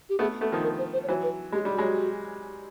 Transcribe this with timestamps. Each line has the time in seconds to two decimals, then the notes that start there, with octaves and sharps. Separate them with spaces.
0.09 G4
0.19 A3 B3 G#4
0.41 A3 B3 A4
0.52 D#3 F3
0.64 A#4
0.78 C5
0.93 C5
1.04 C#5
1.08 E3 F#3 C5
1.23 B4
1.52 G#3 G4
1.65 G3 G4
1.75 F#3 G#3 F#4